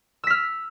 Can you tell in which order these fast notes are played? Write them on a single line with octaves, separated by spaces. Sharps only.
E6 B6 F6